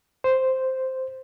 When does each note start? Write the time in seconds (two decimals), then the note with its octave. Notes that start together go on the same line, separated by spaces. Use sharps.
0.24 C5